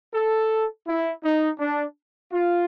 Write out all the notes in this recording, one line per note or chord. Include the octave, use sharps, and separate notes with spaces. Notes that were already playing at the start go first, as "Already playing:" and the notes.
A4
E4
D#4
D4
F4